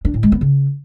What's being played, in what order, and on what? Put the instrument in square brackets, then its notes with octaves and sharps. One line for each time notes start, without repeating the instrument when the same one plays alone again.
[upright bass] D4
A2
G#3
B3
C#3